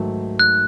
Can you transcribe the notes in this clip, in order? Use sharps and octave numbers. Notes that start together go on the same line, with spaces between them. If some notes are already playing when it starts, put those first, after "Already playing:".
Already playing: G#2 D#3 F#3 A3
F#6